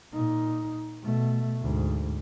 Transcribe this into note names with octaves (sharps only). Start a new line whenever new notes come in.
A#2 D#4
B2 A3
D2 G#2